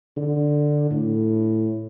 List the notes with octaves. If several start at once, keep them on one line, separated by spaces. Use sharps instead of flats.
D3
A2